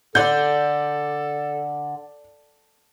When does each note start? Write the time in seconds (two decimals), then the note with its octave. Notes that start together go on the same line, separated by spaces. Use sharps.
0.15 D3 A4 D5 G6